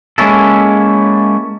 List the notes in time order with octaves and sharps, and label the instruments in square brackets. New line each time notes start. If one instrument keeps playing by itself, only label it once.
[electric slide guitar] G#3 A#3 C#4 E4 A4